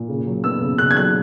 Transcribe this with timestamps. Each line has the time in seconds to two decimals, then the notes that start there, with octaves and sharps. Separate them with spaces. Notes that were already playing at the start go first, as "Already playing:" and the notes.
Already playing: A#2
0.09 C#3
0.26 F#3
0.44 B3 E6
0.61 C#3
0.78 C#3 F#6
0.91 G#6
0.96 F#3 F#6